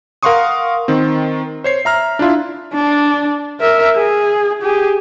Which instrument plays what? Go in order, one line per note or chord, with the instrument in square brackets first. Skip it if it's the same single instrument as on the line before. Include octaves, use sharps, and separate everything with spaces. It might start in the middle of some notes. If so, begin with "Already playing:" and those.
[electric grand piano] A#4 F5 F#5 C6 C#6 D#6
D#3 C4
C5 C#5 C7
E5 A#5 F6
D4 E4 F4 E5
[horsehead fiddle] D4
A#4 E5
G#4
G4 G#4